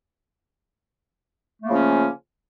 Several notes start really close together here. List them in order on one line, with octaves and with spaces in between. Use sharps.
A3 A#3 C#3 F3 C#4